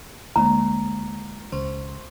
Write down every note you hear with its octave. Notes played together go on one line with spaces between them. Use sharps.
D2 G#3 A#3 E4 A#5
C#2 C5 C6 C#6